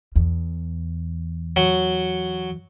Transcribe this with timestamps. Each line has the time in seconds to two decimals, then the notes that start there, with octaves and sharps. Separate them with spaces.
0.16 E2
1.56 F#3